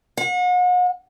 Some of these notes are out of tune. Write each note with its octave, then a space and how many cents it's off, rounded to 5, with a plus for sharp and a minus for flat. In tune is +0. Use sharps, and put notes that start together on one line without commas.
F#5 -40